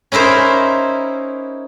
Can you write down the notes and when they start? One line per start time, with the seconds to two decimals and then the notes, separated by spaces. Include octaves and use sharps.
0.12 C#4 D#4 E4 A#4 C5